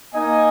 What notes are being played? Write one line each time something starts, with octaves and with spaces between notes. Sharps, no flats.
A#3 D#4 D#5 G#5